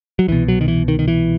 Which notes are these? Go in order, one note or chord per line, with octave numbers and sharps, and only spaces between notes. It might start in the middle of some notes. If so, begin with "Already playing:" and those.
F#3
C2 B2 E3
F#3
D#3
E3
D#3
D#3
E3